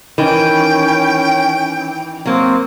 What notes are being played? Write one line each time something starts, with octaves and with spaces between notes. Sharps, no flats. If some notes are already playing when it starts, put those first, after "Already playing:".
D#3 E3 C#4 G5
F#3 A#3 C4